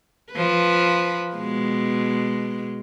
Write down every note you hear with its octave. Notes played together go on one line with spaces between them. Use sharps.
F3 B4
B2 G#3